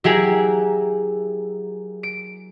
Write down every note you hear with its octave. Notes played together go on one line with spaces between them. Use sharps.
F#3 E4 G4 G#4 A#4
D7